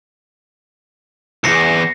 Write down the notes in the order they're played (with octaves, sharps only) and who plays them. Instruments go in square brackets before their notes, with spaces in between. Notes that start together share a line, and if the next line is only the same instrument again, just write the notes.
[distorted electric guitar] B1 E2 [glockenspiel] A#6 C7 C#7